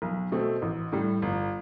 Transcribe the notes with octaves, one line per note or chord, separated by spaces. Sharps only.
B1
B2 A3 C4
A1
A2 G3
G1